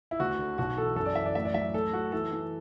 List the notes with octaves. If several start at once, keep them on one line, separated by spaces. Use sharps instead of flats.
E4
D2 F#4
D3
B1 F#4
E3 A4
F#2 A4
D5
E3 E5
D5
A2 E5
D5
F#3 E5
A2 A4
A2 F#4
E3 A4
E3